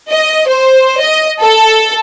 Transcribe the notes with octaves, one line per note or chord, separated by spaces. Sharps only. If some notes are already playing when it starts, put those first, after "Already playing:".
D#5
C5
D#5
A4